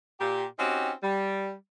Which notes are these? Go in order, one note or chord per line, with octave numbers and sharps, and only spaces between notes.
A#2 G4
C4 C#4 D#4 F#4 G4
G3